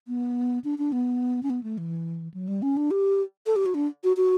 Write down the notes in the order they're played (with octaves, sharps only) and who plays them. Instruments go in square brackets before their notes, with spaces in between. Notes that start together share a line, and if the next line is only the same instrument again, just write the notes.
[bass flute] B3
D4
D4
B3
C#4
B3
A3
E3
F#3
G3
C#4
D4
G4
A4
G4
F#4
D4
F#4
F#4